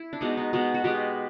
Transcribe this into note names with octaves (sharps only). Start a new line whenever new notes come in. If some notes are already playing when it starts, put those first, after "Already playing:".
Already playing: E4
D4
B2 G#3 B3 D#4
D#4
B2 G#3 B3
F#4
B2 G#3 B3 G4